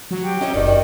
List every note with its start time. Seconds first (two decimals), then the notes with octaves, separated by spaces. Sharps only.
0.11 F#3
0.24 G4
0.41 C#4 D#4 D#5 E5
0.54 F#1 D#3 D5
0.67 F#4 D5